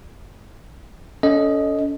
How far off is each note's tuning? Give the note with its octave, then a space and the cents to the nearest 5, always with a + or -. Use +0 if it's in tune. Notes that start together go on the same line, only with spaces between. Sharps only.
C#4 +30 A4 +0 D#5 +0